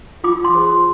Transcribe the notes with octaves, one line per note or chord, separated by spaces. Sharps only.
F4 D6
C6
G#4 C5